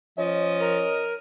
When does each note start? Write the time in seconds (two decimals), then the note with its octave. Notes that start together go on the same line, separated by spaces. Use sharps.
0.18 F3 C#4 D#5
0.60 A#4